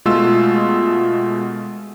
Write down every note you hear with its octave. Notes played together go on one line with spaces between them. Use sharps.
B2 G#3 A3 F4 E6